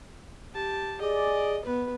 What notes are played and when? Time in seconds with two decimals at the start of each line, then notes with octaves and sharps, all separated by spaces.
0.53 G4 A5
1.01 G#4 D5 D#5
1.64 B3 B4